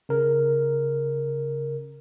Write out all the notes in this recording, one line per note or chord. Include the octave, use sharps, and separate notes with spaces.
C#3 A#4